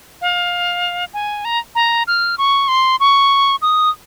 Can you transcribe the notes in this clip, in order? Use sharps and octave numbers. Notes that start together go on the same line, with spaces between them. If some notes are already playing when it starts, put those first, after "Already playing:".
F5
G#5
A#5
A#5
F6
C#6
C6
C#6
D#6